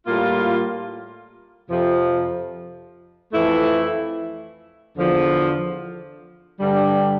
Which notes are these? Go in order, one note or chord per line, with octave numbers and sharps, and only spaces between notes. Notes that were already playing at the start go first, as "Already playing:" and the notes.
A2 G3 A#3 F4
F2 C3 F3
F2 E3 A3 E4
E2 D3 F3
G2 D3 G3